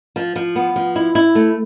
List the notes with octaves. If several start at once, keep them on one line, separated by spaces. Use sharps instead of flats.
F3
F3
B3
F3
E4
E4
A3